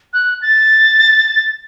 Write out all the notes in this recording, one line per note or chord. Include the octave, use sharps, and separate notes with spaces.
F#6
A6